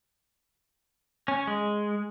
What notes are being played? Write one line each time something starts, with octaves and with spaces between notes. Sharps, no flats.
C#4
G#3